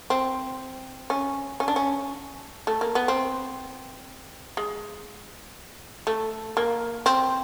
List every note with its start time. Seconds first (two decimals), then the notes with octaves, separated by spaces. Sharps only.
0.10 C4
1.10 C#4
1.60 C#4
1.68 D4
1.76 C#4
2.67 A3
2.81 A#3
2.95 B3
3.08 C4
4.57 G#3
6.07 A3
6.57 A#3
7.06 C4